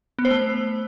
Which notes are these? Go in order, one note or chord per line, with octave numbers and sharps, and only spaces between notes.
B3
C5
A3